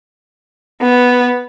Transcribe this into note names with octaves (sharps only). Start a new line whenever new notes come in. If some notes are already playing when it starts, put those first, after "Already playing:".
B3